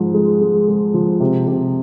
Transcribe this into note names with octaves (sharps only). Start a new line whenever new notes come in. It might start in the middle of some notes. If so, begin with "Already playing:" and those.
Already playing: G#2 F3
G#3
G#3
G#3
F3
C3
C3